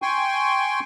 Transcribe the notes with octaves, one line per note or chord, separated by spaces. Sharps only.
G5 G#5 C6 C#6